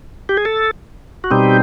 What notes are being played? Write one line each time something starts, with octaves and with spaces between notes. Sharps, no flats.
G4
G#4
A4
F#4
B2 G3 C4 D#4 G4